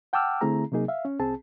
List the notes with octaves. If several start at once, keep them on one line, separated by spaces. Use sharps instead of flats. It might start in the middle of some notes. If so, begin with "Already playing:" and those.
F#5 G5 A5 D6 E6 F6
D3 A3 C4 E4 G#4 A#5
C3 F#3 A#3 D#4 G#4
E5 F5
C#4
C2 C4 G#4 A5